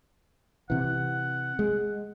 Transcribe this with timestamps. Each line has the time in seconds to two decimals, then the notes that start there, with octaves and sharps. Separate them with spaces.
0.70 C3 E3 F#5
1.59 G#3